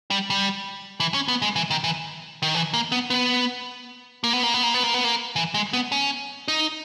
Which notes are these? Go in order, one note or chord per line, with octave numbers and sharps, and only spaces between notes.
G3
G3
E3
C#4
B3
G#3
E3
D#3
E3
D#3
E3
A#3
B3
B3
A#3
B3
A#3
B3
A#3
B3
A#3
B3
A#3
E3
G#3
B3
C#4
D#4